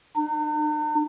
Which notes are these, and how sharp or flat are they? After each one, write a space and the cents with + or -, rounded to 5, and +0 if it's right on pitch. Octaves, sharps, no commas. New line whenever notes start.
D#4 -45